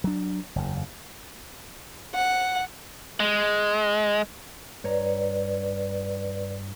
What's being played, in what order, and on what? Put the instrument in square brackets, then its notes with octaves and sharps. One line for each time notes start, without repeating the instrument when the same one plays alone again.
[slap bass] F#3 D4
F#1 E2
[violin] F#5
[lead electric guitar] G#3
[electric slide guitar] G2 C#5 A#5 [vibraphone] B4 D5